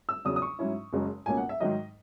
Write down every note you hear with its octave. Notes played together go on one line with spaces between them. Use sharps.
E6
E2 C#3 F#3 D#6
D#6
C#6
G#2 F#3 C#4 E4
F#1 F#2 C#3 G#3
C#2 B2 A#3 C#4 G#5
F#5
E5
G#2 D#3 F#3 D#5